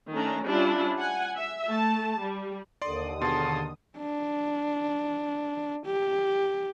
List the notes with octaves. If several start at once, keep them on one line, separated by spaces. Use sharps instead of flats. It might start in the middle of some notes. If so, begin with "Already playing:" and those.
D#3 A3 C#4 D4 A#5
G3 C#4 D4 E4 F4
F#5 G#5
E5
A3 A5
G3
D#2 D3 D5 C6 D#6
B2 G#4 A5 C6
D4
G4